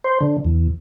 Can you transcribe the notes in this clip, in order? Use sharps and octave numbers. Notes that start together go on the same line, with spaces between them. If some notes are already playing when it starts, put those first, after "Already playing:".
C5
D3
E2